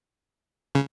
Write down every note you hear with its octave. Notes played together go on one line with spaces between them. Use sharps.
C#3